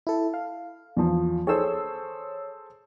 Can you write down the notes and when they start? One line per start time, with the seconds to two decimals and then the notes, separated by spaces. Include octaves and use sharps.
0.07 E4 A4
0.34 F5
0.97 E2 F3
1.47 G#4 A4 C5 C#5 E6